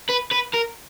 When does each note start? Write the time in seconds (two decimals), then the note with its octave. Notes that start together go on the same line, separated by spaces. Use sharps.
0.09 B4
0.31 B4
0.53 A#4